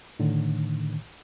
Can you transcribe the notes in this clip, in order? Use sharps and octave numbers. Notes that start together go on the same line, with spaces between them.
A2 D3 D#3